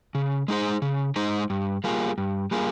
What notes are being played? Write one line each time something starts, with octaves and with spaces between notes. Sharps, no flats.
C#3
G#3 D#4 G#4 C5
C#3
G#3 D#4 G#4 C5
G2
G3 A#3 F4 G#4
G2
G3 A#3 F4 G#4